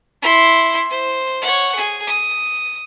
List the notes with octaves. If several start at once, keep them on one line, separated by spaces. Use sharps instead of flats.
E4 C6
C5
C#5 F#5
G#4
D#6